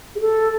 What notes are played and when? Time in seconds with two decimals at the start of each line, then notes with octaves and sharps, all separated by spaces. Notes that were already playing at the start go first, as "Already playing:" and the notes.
0.15 G#4
0.20 A4